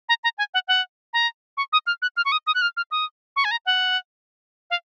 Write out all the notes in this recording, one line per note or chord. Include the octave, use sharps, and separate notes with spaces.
A#5
A#5
G#5
F#5
F#5
A#5
C#6
D#6
F6
F#6
F6
C#6
D#6
D#6
F#6
F6
F6
D#6
C#6
G#5
A#5
F#5
F5